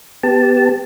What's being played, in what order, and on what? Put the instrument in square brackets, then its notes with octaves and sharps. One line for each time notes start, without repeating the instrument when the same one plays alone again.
[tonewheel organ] B3 G4 A5